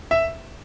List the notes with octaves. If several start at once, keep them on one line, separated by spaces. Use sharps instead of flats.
E5